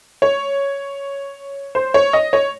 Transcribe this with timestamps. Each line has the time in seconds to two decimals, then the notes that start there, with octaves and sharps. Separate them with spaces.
0.22 C#5
1.75 C5
1.94 C#5
2.13 D#5
2.33 C#5